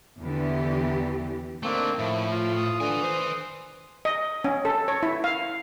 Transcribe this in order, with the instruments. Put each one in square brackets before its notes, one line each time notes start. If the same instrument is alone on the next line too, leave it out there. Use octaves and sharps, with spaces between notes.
[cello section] E2 D3 E3 B3 G4
[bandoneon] D#3 A#3 C4 [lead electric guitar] A3 D4
[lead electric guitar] A2 [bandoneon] F3 [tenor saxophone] E4
[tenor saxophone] F4
[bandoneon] D#6
[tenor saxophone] D3 [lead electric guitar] B4 G#5
[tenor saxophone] C5
[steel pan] D#5
C#4
A4
C#5
E4
F5